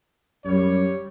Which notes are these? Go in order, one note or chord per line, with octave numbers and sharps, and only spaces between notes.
F#2 G3 C#5